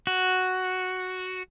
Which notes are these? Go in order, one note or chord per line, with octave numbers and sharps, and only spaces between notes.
F#4